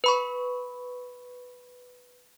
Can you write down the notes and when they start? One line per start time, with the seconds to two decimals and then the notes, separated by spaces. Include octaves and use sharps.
0.04 B4 B5 C#6